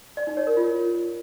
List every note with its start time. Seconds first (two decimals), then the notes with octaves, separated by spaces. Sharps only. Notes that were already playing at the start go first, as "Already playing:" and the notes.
0.17 D5
0.27 D#4
0.37 C#5
0.47 A#4
0.57 F4